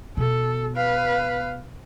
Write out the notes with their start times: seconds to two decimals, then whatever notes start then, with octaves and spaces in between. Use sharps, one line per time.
0.17 B2 A4
0.77 B4 F5